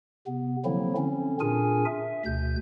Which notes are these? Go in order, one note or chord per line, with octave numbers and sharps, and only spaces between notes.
C3 B3
D3 F3 F#3 A#3 C4 E4
D3 C4 C#4
A#2 D4 F4 G#4 A#4 G#5
E5
D2 B2 G6